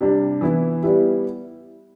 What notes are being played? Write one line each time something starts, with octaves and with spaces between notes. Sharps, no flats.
C3 G3 D4
E3 B3 E4
G3 B3 E4 G4